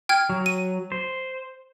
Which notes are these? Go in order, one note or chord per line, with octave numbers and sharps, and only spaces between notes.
G5 F6 G#6
F#3
D#7
C5